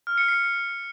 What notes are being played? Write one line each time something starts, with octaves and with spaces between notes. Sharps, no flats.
F6
C#7
C7